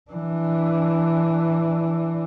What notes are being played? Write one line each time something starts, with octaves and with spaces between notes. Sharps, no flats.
E3 D4